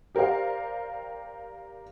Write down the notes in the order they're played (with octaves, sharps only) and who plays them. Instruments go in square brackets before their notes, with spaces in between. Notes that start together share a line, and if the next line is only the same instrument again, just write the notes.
[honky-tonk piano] G4 A#4 C5 D5 F5